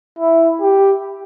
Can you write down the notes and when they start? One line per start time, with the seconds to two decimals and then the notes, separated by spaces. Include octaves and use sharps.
0.19 E4
0.62 G4